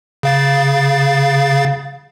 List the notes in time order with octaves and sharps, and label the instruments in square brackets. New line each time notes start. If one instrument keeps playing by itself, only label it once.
[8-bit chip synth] C#3 F5 A6